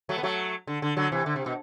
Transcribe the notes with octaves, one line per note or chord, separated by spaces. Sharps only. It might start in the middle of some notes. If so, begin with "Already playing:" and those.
F#3 A3
B3
F#3 A3
D3
D3
D3 F#3
C3 E3
D3
C3
B2